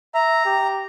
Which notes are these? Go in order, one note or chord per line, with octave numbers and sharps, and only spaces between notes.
E5 A#5
G4